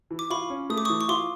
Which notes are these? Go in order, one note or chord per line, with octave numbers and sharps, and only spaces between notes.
E3
D6
F4 B5 C#6
C#4
A3 D#6
D6
E3 C#6 D#6
C#6
F4 C6 D6